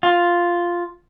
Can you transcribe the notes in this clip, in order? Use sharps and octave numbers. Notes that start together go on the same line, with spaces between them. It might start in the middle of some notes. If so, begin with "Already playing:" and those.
F4